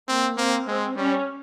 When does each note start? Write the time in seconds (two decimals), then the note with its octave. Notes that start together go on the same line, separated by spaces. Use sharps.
0.08 A#3 C4
0.37 A#3 C4
0.67 G#3 C4
0.97 G3 C#4